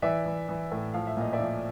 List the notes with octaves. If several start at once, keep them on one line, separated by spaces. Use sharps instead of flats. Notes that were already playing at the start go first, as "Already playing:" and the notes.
E3 D5 E5
E3
E3
A2
F3 F5
E5
A#2 D#5
D5 E5
F3